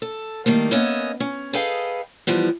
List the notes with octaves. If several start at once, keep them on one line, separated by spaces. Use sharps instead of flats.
A4
D#3 G3 A3 A#3
A#3 B3 C#4 B4 D#5 E5
C#4
G#4 A4 B4 D#5 F5 G5
E3 F3 G3 B3